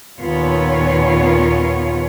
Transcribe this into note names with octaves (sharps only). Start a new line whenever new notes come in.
D#2 A#2 B3 F4 C#5